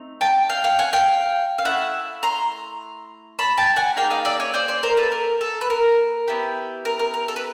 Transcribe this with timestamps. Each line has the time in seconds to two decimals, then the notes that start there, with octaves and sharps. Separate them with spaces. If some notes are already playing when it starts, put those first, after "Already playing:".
Already playing: A3 C4 D#4
0.21 G5 A5
0.49 F5 G5
0.64 F5 G5
0.79 F#5 G#5
0.93 F5 G5
1.58 F5
1.65 A3 C4 E4 E5 F#5
2.23 A#5 C6
3.39 A5 B5
3.57 G5 A5
3.76 F#5 G#5
3.96 A#3 D#4 G#4 F5 G5
4.10 D#5 F5
4.25 D5 E5
4.40 C#5 D#5
4.54 C5 D5
4.68 C5 D5
4.83 A#4 C5
4.97 A4 B4
5.12 A#4
5.41 A4
5.61 B4
5.70 A#4
6.28 B3 E4 G4
6.85 A#4
6.99 A#4
7.14 A#4
7.28 A4
7.36 B4